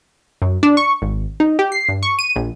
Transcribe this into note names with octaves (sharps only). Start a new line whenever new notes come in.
F#2
D4
C#6
G#1
D#4
G4
C7
G2
C#6
D#7
A#1